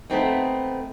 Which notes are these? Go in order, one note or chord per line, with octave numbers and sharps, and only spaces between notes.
A3 B3 C4 D#4